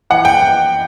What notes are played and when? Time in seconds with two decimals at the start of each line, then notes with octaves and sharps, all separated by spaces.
0.10 E3 F#5
0.25 G5